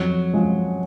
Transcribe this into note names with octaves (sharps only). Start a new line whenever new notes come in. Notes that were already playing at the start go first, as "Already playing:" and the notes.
Already playing: F2 F#3
F3 G#3